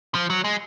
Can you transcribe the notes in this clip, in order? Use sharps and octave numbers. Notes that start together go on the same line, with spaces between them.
F3
F#3
G#3